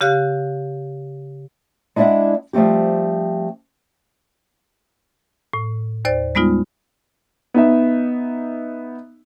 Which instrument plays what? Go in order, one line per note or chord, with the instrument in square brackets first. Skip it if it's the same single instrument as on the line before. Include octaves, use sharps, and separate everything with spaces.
[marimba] C#3 G4 F5 F#6
[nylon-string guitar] G#3 D4 E4 D5 E5 F#5
F3 G3 A3 C4 G4
[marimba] A2
D#2 C5 D5 A6
G3 G#3 B3 D#4 F4
[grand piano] B3 D#4 E5